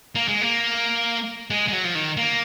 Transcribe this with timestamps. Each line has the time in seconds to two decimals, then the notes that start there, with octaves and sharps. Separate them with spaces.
0.15 A#3
0.28 G#3
0.42 A#3
1.50 G#3
1.68 G#3
1.72 F#3
1.84 F3
1.95 D#3
2.17 A#3